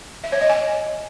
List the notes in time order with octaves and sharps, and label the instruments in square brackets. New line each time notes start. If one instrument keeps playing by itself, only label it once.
[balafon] E5
C#5
D#5
G#5